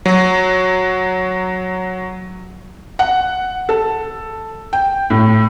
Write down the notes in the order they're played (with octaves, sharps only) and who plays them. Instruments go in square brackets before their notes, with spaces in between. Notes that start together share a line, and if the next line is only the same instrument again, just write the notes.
[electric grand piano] F#3 F#4
[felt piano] F#5
A4
G5
A2